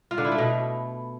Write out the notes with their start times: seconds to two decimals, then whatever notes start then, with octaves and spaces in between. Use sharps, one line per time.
0.11 F4
0.18 D3
0.25 E4
0.31 A3
0.38 B2